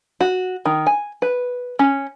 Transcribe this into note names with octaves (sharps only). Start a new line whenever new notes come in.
F#4
D#3
G#5
B4
C#4